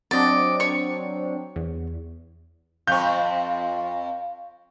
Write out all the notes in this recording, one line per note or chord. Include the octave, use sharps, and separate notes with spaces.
F#3 C4 D4 D5 D#5
C#5 C#6
E2
F2 C4 F5 C#6 G6